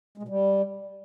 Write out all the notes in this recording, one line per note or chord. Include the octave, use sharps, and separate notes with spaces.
G#3
B2
G3